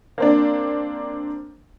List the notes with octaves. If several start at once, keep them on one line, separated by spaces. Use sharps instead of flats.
A#3 C4 D4